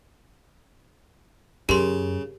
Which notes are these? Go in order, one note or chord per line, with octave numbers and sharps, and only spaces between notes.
F#2 C#3 G4 A#4 C6